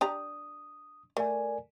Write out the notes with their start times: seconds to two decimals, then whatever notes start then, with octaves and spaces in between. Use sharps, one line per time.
0.01 D4 G4 A#5 D#6
1.17 A3 A#4 D5 G#5